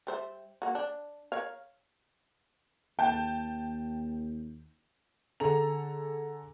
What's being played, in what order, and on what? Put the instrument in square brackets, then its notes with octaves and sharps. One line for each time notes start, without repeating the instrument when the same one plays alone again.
[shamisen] G3 C5 E5
A#3 F#4
D4
A#4 C#5 F5
[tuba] D#2 [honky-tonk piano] G5 A5 G6
[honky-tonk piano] D3 G#4 A4 A#5 F7